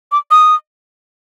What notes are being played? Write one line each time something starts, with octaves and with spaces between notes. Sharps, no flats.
D6
D#6